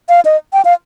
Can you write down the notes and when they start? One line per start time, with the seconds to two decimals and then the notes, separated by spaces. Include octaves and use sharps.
0.09 F5
0.25 D#5
0.53 G5
0.65 F5